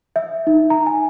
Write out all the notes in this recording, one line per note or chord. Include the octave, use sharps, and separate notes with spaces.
E5
D#4
A#5
G#5